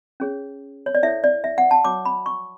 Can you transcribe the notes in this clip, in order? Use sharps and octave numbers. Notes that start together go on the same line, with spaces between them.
C#4 G#4 C#5
C#5
D5
E4 A4 C#5 E5
D5
E5
F#5
A5
F#4 C#5 D6
B5
C#6